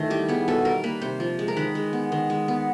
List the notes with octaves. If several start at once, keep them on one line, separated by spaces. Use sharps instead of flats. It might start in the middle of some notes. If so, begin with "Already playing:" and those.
Already playing: D#3 E3 A3
G3 G4
B3 G#4
B2 A4
G3 A#4
A#3 B4
C3 C5
F3
G#3
A#4
D#3 B4
G#3
B3
D#3
G#3
B3